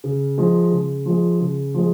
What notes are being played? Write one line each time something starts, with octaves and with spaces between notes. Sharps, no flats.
C#3
F3 G#3
C#3
F3 G#3
C#3
F3 G#3